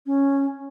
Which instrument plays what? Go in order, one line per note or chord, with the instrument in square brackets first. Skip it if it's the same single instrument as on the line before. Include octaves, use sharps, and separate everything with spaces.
[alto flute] C#4